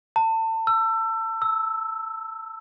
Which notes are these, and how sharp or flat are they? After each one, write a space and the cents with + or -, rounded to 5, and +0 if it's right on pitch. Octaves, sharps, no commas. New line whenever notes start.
A5 +30
E6 +25
E6 -10